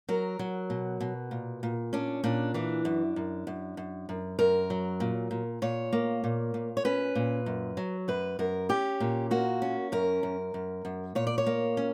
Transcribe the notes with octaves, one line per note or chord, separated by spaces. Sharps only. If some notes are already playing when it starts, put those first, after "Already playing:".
F#3 A#4
F#3
B2
B2
A#2
A#2
C#4 D4
A#2 D4
E3 D4
F#2
F#2
F#2
F#2
F#2
F#2 A#4
F#3
A#2
A#2
A#2 C#5
A#3
A#2
A#2
C#5
C#4 B4
A#2
F#2
F#3
F#2 B4
F#2 A#4
C#4 G4
A#2
A#3 F#4
C#4
F#2 A#4
F#2
F#2
F#2
A#2 C#5
D5
C#5
A#3
C#4